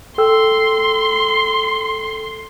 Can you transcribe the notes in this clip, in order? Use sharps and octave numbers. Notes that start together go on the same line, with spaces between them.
A4 G5 C6 E6